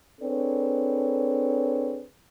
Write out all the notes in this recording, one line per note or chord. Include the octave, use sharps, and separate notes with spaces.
C4 D4 G#4 A4 B4 C#5